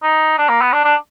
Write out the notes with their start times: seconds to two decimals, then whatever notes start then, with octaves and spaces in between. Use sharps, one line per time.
0.03 D#4
0.38 D4
0.49 A#3
0.61 B3
0.73 D4
0.84 D4